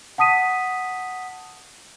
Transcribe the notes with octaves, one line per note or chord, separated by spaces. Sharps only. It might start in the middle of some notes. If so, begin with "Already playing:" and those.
F#5 A5 D#6 B6 D#7